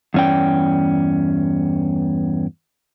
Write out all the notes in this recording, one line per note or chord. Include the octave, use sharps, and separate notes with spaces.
E2 G2 C#4 D5 G5